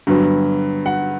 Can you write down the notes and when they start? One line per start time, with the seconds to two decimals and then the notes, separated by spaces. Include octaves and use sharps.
0.07 G2 D3 F#3 B3
0.86 F#5